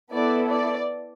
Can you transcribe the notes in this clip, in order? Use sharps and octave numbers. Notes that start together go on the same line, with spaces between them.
B3 E4 A4 D5
D5